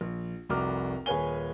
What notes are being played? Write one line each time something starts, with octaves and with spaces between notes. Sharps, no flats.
A#1
F1 C2 F#4 A#5 D6 F6
D#1 G#4 B4 C#5 G#5 G7